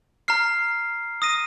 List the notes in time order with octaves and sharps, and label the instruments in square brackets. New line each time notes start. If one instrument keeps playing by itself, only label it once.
[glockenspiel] A#5 F6 C7
D#6 A#6 D#7